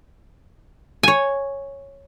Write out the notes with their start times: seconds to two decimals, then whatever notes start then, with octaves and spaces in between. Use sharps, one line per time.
1.03 C#5 G#5